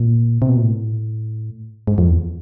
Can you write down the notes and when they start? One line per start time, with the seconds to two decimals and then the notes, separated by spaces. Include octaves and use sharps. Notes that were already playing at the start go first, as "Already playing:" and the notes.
Already playing: A#2
0.42 C3
0.49 B2
0.56 A#2
0.63 A2
1.87 G#2
1.98 F2
2.08 E2